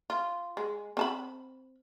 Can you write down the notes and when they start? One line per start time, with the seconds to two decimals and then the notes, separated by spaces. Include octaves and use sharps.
0.10 F4
0.57 G#3
0.97 C4 A5 B5